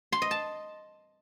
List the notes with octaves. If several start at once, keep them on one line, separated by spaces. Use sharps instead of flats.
C6
D#5
A5